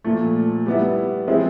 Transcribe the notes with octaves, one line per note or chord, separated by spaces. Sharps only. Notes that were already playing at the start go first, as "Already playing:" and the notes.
A#2 F3 A3
G3 B3 E4
F3 G#3 C4 E4